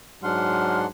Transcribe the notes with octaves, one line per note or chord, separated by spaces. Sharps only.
G#2 F#3 D4 F#5 C6 F6